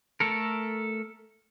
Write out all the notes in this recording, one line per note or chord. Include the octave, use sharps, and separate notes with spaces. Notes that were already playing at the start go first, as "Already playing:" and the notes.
A3 A4 A#4